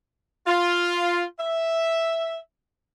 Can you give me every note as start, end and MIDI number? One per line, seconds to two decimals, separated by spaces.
0.47 1.24 65
1.39 2.38 76